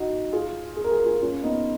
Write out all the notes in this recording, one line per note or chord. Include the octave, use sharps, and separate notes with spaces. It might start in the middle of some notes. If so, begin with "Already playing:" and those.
Already playing: D#4 F#4
F4 G#4
G#4
A#4
G#4
A#4
F4 G#4
C#4 F4
B3 D#4